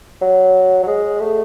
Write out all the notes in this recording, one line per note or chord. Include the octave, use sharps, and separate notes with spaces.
F#3
F#3
G#3
A3